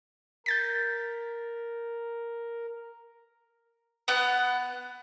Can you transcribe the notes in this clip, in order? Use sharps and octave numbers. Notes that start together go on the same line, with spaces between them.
A#4 G6 A6 B6
B3 F#5